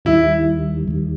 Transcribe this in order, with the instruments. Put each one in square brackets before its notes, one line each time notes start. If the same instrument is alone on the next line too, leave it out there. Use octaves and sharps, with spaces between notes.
[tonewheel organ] D#2 D#3 G3 [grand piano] E4
[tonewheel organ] D#2 D#3 G3